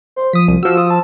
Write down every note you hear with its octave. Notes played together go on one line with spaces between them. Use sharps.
C5
F3 D#6 B6
C2 D#7
F3 F#4 E6
D#6
A5